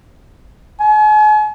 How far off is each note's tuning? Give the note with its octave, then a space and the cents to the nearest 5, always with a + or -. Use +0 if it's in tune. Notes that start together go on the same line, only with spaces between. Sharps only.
G#5 +40